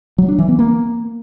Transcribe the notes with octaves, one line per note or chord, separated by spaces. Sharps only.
F#3
D4
E3
B3
A#3